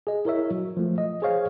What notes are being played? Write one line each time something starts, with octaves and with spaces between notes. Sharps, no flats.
G#4 D#5
E4 A#4 C#5 E5
F#3
F3 A3
D#5
G#4 C5 C#5 F5